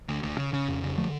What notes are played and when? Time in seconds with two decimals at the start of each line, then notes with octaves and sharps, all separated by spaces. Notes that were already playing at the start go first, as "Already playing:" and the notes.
0.08 D2
0.23 D2
0.38 C#3
0.53 C#3
0.68 F2
0.83 C#3
0.98 D3 F3 A3